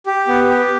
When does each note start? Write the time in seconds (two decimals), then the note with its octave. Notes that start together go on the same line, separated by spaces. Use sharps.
0.06 G4
0.28 B3
0.49 G4